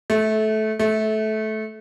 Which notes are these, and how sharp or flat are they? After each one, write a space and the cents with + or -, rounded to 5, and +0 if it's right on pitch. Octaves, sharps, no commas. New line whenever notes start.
A3 -20
A3 -20